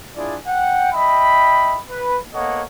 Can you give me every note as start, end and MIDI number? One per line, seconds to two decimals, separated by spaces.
0.16 0.37 62
0.16 0.37 64
0.16 0.37 65
0.16 0.37 68
0.16 0.37 74
0.47 0.91 78
0.47 0.91 79
0.93 1.79 75
0.93 1.79 76
0.93 1.79 79
0.93 1.79 83
1.89 2.18 71
2.34 2.63 58
2.34 2.63 59
2.34 2.63 69
2.34 2.63 73
2.34 2.63 75
2.34 2.63 78